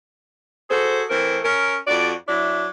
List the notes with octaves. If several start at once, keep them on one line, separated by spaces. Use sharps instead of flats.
F#4 G#4 A4 C5
E3 A3 C4 A#4
C#4 A#4
F2 F#4 D5
F#3 D4 E4